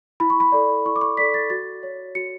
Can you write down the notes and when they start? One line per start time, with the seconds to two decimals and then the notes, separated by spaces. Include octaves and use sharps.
0.20 E4 B5
0.30 C#6
0.40 B5
0.52 A4 D5
0.86 E4 C#6
0.96 D6
1.01 C#6
1.17 A4 D5 B6
1.34 A6
1.50 F#4 A6
1.83 C#5
2.15 F#4 C#7